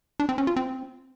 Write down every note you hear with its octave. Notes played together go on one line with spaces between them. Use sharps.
D4
C4
C#4
F4
C4